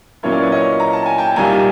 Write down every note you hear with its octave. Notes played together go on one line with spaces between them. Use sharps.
A#2 F#3 A#3 C#4 E4 C#5
D5
B4 C#5
C#5 D#5
A#5
A5
G#5
G5 A5
C2 A#2 G3 A#3 D#4 G#5 A#5